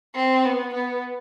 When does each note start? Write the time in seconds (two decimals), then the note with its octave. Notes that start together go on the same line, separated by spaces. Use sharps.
0.15 C4
0.45 B3
0.74 B3